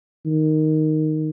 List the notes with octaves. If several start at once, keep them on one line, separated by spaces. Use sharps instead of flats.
D#3